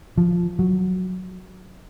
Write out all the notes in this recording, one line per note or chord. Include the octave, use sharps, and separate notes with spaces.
F3
F#3